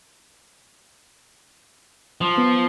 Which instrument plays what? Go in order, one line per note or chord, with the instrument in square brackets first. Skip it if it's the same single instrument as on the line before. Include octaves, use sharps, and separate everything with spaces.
[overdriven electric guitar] F3
[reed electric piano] B3